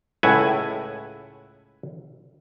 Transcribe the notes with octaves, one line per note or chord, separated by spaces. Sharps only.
C#2 A2 E4 F#5 G#5